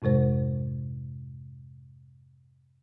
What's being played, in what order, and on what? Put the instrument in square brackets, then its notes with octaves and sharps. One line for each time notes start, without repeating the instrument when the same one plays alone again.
[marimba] F2 G#2 C3 G#3 C5